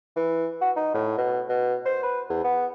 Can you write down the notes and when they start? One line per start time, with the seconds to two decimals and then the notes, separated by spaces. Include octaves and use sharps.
0.16 E3
0.61 F#4
0.76 D#4
0.94 A2
1.18 B2
1.49 B2
1.86 C5
2.03 B4
2.30 E2
2.44 B3